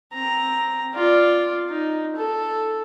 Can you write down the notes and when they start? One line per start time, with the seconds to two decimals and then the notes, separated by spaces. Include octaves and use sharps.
0.14 C4 A#5
0.95 F4 D5
1.70 D#4
2.16 A4